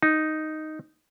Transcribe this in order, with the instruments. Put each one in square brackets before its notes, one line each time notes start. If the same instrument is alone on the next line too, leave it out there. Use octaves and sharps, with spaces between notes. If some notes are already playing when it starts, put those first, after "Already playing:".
[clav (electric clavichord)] D#4